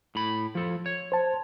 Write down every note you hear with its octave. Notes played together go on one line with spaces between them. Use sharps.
A2 B5
F3 A4
C#5
C5 A5